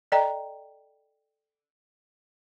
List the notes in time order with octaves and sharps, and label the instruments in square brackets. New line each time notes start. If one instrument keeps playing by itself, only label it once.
[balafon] A4 D5 D#5 G5 A#5